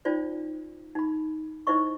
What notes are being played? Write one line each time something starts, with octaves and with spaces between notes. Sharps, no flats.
C#4 D#4 F4 C5 D5
D#4 B5
D#4 E4 C5 D#5 C#6